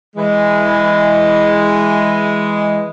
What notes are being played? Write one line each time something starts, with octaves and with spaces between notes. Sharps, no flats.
E3 G#3